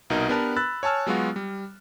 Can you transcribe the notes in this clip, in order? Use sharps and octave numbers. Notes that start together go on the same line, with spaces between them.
C2 B2 D#4 A#4
B3 D4 G4 A#4 B4 A5
B5 E6 F#6 A6
C#5 G#5 A5 E6 F6
F#3 G#3 B3 F4 F#4
G3